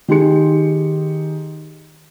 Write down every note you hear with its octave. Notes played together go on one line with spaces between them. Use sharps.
D#3 G4 G#4 C6 C#7